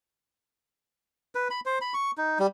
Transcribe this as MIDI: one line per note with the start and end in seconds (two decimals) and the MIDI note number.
1.35 1.48 71
1.51 1.60 83
1.66 1.79 72
1.81 1.94 83
1.94 2.11 85
2.18 2.38 63
2.39 2.47 55